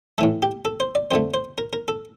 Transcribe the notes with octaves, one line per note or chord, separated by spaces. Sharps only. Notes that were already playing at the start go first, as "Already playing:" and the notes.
A2 E3 A3 A4
G4
A4
C5
D5
F2 D3 A3 C5
C5
A#4
A#4
A4